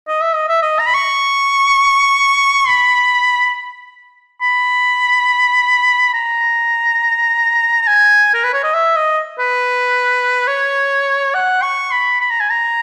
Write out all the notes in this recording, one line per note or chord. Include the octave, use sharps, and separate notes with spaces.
D#5
E5
D#5
E5
D#5
A#5
B5
C#6
B5
B5
A#5
A#5
G#5
A#4
B4
C#5
D#5
E5
D#5
B4
C#5
F#5
C#6
B5
B5
A#5
G#5
A#5